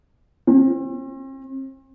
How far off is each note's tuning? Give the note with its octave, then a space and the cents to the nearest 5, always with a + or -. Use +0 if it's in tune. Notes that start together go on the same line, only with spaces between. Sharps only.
C4 +45